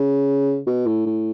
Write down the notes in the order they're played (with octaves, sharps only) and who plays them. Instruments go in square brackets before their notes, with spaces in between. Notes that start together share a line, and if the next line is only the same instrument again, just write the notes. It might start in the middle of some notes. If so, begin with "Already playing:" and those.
Already playing: [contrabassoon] C#3
B2
A2
A2